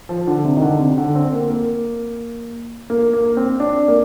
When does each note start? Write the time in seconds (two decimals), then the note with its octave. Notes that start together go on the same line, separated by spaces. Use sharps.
0.09 F3
0.27 D3
0.44 C3
0.56 D#3
0.62 D3
0.79 C3
0.98 D3
1.15 C4
1.33 A#3
1.50 A#3
2.90 A#3
3.13 A#3
3.37 C4
3.60 D4
3.88 A#3